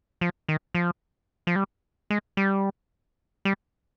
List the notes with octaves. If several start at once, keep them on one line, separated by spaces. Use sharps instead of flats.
F3
D#3
F3
F3
G3
G#3
G3
G3